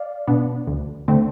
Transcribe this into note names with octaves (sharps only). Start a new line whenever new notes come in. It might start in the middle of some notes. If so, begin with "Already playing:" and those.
Already playing: D5 F5
B2 B3 D4
D2
D3 A3 C4